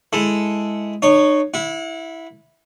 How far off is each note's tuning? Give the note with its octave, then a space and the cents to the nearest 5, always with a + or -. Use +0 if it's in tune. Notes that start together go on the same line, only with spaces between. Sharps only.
G#3 +0 E4 +0 A4 +0
D#4 -40 C#5 +0
E4 -5 F#5 -40